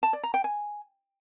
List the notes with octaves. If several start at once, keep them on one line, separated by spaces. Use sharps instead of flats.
A5
D5
A#5
G5
G#5